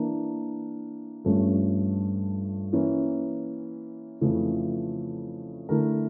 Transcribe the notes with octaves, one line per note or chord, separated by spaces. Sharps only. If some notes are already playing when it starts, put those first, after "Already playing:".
Already playing: E3 A#3 D4
G2 F3 A3 C#4
E3 A#3 C#4
F2 C#3 E3 A3
D3 A3 E4 A#4